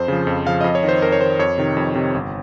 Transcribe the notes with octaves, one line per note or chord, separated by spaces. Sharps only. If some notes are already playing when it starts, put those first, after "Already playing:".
Already playing: F2 C5
C#3 F3
F2
C#3 F3 F5
F2 D#5
C#5
D#3
C5
F2 A#4
C#5
D#3 C5
F2 C#5
C3 D#3
F2
C3 D#3
G1